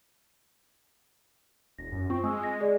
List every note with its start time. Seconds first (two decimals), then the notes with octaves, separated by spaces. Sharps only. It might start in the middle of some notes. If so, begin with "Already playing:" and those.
1.78 E1 A#6
1.92 F#2
2.10 C4 F4 C#6
2.24 G#3 G#5 D#6 E6
2.43 A#6
2.60 G#4 D5 D#5